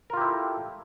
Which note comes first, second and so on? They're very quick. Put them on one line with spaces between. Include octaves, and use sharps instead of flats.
A#4 F4 G4 E4 A4